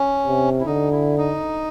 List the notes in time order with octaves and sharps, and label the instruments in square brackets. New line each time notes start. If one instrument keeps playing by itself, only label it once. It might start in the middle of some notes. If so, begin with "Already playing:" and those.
Already playing: [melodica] C#4
[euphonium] C3
[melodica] E4
[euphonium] D3 [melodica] D#4
[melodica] E4
D#4